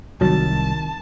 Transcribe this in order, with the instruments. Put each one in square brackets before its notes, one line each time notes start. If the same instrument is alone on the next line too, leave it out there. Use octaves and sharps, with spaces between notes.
[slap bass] C2 [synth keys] D#3 [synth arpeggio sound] F#3 A6 [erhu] A5